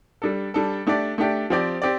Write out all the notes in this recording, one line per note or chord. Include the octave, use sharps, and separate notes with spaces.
G3 D4 A4
G3 D4 A4
A3 D4 G4 D5
A3 D4 G4 D5
F3 C4 G4 D5
C4 G4 D5